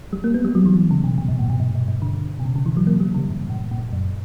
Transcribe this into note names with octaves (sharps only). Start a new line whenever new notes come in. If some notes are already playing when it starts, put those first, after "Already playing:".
G3
A#3
B3
G3
F#3
E3
C#3
B2
B2
G2
A#2
B2
G2
G2
G2
D3
B2
C#3
C#3
E3
F#3
A#3
G3
C#3
G2
A#2
A#2
F#2